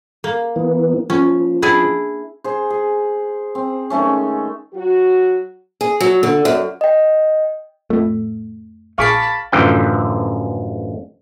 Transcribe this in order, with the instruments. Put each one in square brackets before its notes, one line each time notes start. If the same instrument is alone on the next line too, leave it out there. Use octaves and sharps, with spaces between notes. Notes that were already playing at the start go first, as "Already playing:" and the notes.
[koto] A#3
[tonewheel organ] E3 B3
[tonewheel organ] F3 [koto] C#4
[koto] D4 E4 G#4
[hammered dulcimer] G#4 C5
G#4
C4
D#3 G#3 A3 C#4
[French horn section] F#3 F#4
[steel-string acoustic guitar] G#4
F#3
D3
F#2
[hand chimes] D#5 G5
[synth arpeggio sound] F2 A2 [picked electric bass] A3
[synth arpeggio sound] A#1 G#4 C7 [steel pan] F5 C#6 D6 [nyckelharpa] A5 B5
[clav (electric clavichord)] A1 F#2 D3 E3 F3 G5